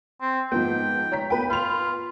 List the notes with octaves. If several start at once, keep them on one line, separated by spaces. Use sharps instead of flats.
C4
G#2 F3 B3 G5
C#5 A#5 B6
B3 B4 G5
F4 B5 F7